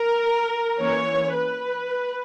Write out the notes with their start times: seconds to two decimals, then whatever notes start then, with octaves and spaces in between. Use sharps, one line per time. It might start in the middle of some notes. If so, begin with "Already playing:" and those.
Already playing: A#4
0.79 E3 A#3 C#4 C#5
1.34 B4